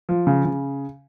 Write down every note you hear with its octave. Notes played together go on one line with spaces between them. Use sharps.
F3
C#3
C#3